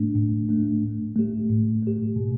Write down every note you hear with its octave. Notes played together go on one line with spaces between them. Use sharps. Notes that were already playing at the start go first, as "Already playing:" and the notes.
Already playing: A2 A3 D4
A2
A3 D4
A2
A3 G4
A2
A3 G4
B2